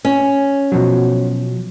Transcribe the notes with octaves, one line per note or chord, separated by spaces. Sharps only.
C#4
B2 F3 F#3